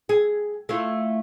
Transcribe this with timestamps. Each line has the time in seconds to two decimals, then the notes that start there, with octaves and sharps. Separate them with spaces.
0.09 G#4
0.69 A3 E4 F4